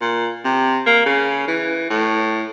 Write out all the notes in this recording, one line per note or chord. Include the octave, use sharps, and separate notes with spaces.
A#2
C3
A#3
C#3
E3
A2